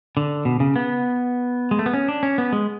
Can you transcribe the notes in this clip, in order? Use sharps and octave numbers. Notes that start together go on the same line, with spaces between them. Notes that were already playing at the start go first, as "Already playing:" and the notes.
D3
B2
C#3
B3
G#3
A3
B3
C#4
D4
C#4
B3
G#3